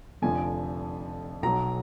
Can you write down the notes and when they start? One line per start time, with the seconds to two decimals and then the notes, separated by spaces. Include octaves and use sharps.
0.22 F1 F2 D3 F3 G#5
1.42 B1 B2 F#3 A#5